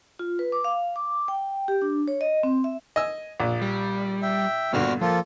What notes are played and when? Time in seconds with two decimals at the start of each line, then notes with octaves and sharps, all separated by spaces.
0.19 F4
0.39 B4
0.52 D6
0.64 F5
0.96 D6
1.28 G5
1.68 G4
1.82 D4
2.08 C#5
2.21 D#5
2.43 C4
2.64 E5
2.96 D#5 G#5 E6
3.40 A#1 A#2
3.62 G3
4.22 E5 G5
4.73 G2 A#2 D3 G3 B3 F#4 D5 F6
5.01 F3 A#3 F4 A4